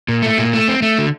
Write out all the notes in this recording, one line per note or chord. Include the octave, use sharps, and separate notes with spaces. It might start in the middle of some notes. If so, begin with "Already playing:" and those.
A#2
A3
A#2
A3
C4
A3
D3